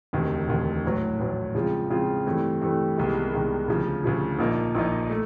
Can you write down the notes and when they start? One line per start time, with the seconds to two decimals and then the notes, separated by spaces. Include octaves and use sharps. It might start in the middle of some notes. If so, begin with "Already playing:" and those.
0.13 E1 D2 C3 D#3
0.48 E1 D2 C3 D#3
0.84 A#1 A2 F#3
1.19 A#1 A2 F#3
1.55 C#3 F3 G#3 C4 F4
1.90 C#3 F3 G#3 C4 F4
2.26 G2 E3 A3 C4
2.62 G2 E3 A3 C4
2.97 C2 C3 D#3 G#3 B3
3.33 C2 C3 D#3 G#3 B3
3.68 D2 C#3 F3
4.04 D2 C#3 F3
4.38 A#1 A#2 F3 A#3 D#4
4.75 A#1 A#2 F3 A#3 D#4
5.10 A3